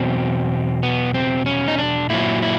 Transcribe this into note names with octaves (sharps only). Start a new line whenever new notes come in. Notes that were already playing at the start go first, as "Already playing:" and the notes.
Already playing: E2 B2 F#3 C4
B3
C4
C#4
D#4
D4
A#2 F#3 E4
E4